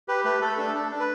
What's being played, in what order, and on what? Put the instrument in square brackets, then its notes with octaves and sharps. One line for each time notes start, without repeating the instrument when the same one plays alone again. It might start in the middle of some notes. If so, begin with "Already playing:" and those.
[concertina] G4 B4
A3 B4
A3 A4
D4 A4
D4
D4
B4